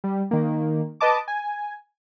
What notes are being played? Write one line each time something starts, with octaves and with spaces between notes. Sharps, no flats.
G3
D#3 A#3
B4 D#5 A5 D6
G#5